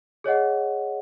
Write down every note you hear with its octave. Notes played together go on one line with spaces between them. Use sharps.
G#4 C#5 D#5 F#5